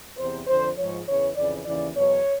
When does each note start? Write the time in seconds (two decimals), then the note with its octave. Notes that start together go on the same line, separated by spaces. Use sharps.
0.17 E2 C3 E3 C5
0.47 F2 D3 F3 C5
0.77 G#2 F3 C#5
1.07 E2 C#3 E3 C#5
1.36 F2 C#3 E3 D5
1.66 D#2 C#3 E3 D5
1.96 E2 B2 F#3 C#5